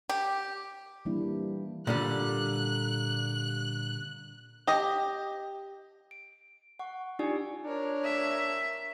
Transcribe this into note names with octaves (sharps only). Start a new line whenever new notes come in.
G4
E3 G3 A#3 D4 E4
A#2 D3 G3 F#6
G4 D#5
D7
F#5 C#6
D4 D#4 F4 G4 D5 G#5
D4 A#4 C#5
E5